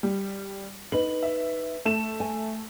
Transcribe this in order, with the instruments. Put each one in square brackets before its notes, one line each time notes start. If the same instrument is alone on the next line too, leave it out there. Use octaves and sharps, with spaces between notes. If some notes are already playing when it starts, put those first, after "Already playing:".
[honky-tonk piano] G3
[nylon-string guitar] D#4 B4 [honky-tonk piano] F#7
[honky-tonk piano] E5
A3 E7
[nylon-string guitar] G#5